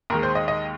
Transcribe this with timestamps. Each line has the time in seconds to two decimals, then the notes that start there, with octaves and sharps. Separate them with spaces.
0.10 D#2 D#3 G#3 A#4
0.23 C5
0.35 D#5
0.48 D#5